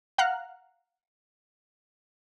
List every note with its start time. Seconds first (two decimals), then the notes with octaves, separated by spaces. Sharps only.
0.18 F5 F#5 A#5 F6 F#6